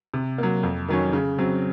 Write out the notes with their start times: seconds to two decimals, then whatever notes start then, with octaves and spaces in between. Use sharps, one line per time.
0.14 C3
0.38 F#3 A#3
0.63 F2
0.88 D#3 F#3 C#4
1.13 C#3
1.39 F#3 C4